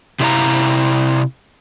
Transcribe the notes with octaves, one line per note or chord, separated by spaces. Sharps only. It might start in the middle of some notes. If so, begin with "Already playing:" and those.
C3 E4 G#4 D5 F5 A#5